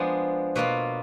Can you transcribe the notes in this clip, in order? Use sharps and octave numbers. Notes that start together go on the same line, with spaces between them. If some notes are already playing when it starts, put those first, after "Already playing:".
Already playing: F3 G#3 B3 D4
B2 A#3 F4 B4